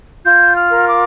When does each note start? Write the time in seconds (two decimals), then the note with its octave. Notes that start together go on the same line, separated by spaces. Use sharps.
0.25 F4 G6
0.55 F6
0.71 A#4
0.87 D6